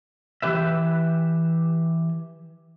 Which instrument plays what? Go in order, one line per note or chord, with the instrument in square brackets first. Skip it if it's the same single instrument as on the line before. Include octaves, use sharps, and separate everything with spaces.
[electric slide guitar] E3 G4 B4 E5